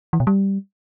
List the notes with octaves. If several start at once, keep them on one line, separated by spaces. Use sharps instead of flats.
E3
B2
G3